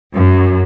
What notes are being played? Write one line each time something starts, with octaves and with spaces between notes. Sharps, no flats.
F#2